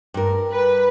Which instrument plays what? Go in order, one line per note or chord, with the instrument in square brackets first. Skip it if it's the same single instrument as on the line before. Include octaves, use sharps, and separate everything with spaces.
[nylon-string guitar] G2 A#4
[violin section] B4